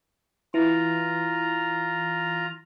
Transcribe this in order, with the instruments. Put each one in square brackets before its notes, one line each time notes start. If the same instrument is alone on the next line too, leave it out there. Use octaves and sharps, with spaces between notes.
[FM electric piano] E3 [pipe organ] F4 A#5